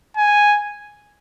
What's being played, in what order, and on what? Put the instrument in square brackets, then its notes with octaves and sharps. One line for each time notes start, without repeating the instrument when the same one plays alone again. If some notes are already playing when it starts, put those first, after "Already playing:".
[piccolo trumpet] G#5